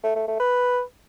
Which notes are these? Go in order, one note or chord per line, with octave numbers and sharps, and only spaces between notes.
A3
A3
A3
B4